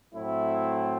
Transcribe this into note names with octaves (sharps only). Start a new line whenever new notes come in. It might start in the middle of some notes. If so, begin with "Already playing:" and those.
A2 F#3 A3 C4 E4